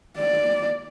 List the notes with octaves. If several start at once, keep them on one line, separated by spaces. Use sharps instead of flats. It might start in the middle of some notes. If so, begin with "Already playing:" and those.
D5